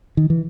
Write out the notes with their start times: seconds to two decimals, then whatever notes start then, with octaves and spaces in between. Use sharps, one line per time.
0.17 D#3
0.30 E3